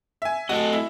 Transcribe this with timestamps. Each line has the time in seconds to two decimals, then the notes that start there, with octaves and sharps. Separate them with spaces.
0.22 E5 G#5
0.49 A3 F#4 A4 D#5
0.73 E4